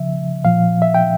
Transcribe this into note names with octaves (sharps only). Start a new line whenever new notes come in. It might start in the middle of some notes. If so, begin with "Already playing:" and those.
Already playing: C#3 F3 E5
A#2 F3 F5
E5
G5